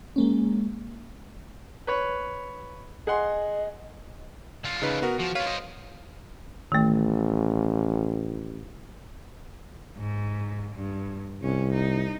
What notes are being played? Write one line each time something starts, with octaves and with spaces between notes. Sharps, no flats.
G#3 A#3 C#4
B4 C#5
G#4 D#5 F#5 C6
D3 F4
C#3 D#4 B4
B3 F#4 A#4
F3 F#4
F4 B4 C#5 F5
C5 D#5
A1 D#3 A3
G#2
G2
C2 C#4
D#4